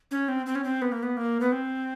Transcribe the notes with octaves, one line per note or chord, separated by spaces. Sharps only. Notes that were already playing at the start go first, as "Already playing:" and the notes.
C#4
C4
C4
C#4
C4
B3
A#3
B3
A#3
B3
C4